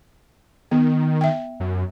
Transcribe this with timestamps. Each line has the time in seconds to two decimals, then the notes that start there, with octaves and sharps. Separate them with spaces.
0.71 D#3 B3
1.21 E5 G5
1.60 F#2